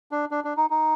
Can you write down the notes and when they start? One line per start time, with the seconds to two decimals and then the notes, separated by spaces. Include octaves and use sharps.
0.11 D4
0.31 D4
0.44 D4
0.57 D#4
0.70 D#4